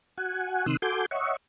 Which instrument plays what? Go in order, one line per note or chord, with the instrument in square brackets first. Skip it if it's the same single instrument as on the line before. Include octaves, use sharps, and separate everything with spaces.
[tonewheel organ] F#4 F#5 G#5
C3 D#3 C6 D#6 E6 F#6
F#4 A4 G#5 C6 D6 G6
C#5 D#5 E5 F#5 C#6